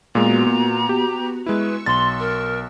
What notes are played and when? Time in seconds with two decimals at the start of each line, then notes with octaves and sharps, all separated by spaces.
0.15 A#2 G#3 B3 F#4 A#5
0.47 A#2
0.89 G4
1.46 G#3 E4 B4 C#6 E6
1.86 B1 C6 A6
2.20 A#4